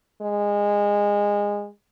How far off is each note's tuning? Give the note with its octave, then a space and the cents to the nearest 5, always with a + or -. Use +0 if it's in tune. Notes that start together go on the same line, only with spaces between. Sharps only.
G#3 -20